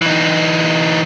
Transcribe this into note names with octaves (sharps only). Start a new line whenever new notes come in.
E3 D#4